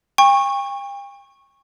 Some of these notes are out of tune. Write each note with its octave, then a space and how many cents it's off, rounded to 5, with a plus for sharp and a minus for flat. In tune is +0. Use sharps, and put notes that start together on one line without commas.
G5 +40 C#6 -15